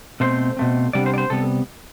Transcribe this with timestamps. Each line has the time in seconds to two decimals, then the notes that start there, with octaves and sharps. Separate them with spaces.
0.20 B2 A3 C4 C5
0.57 B2 A3 C4
0.93 C3 G3 B3 D4 D5
1.06 C5
1.14 D5
1.18 C5
1.30 C3 G3 B3 A4